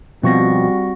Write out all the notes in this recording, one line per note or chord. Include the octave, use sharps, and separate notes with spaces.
B2 F3 G3 C4 F#4 C#6 A#6